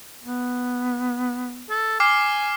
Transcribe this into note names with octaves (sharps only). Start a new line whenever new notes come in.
B3
A4
G#5 D6 F6 C7